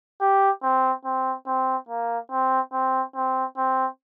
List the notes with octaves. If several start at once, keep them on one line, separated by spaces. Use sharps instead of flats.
G4
C4
C4
C4
A#3
C4
C4
C4
C4